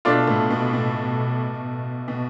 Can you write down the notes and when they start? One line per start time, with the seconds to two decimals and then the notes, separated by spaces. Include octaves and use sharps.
0.05 B2 A3 D4 F4
0.27 A2
0.51 B2
0.73 B2
2.08 B2